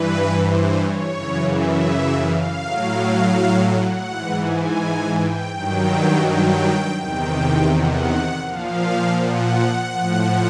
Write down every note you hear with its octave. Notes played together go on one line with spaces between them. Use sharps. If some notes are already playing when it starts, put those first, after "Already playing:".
Already playing: G2 E3 B4
C5
C#5
F#2 C#3 E3
E5
F5
A2 F#3
F#5
G#2 E3
G#5
G5
G2 D#3 F#3 G5
G5
E2 C3 D#3 G5
F#5
A#2 F3 F5
F#5
A2 F3